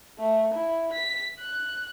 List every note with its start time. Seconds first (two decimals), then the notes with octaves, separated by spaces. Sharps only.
0.18 A3
0.53 E4
0.92 B6
1.40 F#6